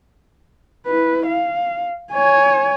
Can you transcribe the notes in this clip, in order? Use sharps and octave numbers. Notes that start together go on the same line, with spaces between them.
E4 B4
F5
C#5 G#5